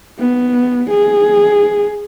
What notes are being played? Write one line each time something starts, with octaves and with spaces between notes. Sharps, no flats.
B3
G#4